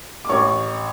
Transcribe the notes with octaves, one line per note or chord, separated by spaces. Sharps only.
D6
A1 C#5 C#6